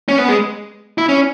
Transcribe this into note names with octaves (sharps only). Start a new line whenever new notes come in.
C#4
B3
G#3
E4
C#4